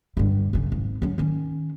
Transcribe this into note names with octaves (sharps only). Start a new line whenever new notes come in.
G2 D3
F#2 C#3
G#1
F#3 C#4
D#3 C#4